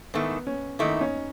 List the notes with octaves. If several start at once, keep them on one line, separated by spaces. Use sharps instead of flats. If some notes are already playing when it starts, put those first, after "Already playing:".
G#2 D#3 A3 B3 E4
C#4
G#2 D#3 A3 D#4 E4
C#4